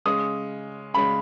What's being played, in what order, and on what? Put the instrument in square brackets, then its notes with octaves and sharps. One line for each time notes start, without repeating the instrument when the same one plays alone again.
[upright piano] C#3 G#3 C#4 [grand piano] D#6
[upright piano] C#3 G#3 C#4 [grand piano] B5